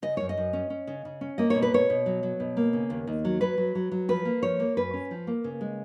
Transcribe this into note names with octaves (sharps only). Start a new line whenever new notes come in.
C#3 D#5
F#2 C#5
D#5
F#2
C#4
C#4
C#3
C#3
C#4
A#3 D#5
B2 C#5
B4
B2 C#5
B2
F#3
F#3
B2
A#3
C#3
D#2
D#2
F#3
F#3 B4
F#3
F#3
F#3
F3 B4
A#3
F3 C#5
A#3
F#2 B4
C#4
F3
A#3
C#3
G#3